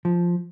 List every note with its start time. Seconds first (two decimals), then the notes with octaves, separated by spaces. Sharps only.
0.05 F3